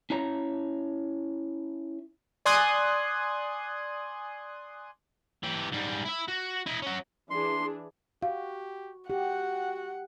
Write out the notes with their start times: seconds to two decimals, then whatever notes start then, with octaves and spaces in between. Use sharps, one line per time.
0.10 C#4 E4 C#5 A#5
2.45 D5 G#5 C6 D#6 F#6 G#6
5.43 E3 G4
5.72 G#2 G3
6.05 E4 E5
6.28 F#4
6.67 E4 D#5
6.82 C#4 F#4
7.30 E3 D4 G#4 C6
8.23 F#4 G4 F5
9.10 F#4 G4 F#5